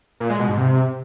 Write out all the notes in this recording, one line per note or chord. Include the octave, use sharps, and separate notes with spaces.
A#2
G#3
B2
G#2
C3